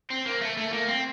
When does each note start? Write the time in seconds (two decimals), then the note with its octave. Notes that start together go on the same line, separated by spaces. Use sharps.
0.11 C4
0.26 A#3
0.41 A3
0.57 A3
0.73 A#3
0.88 C4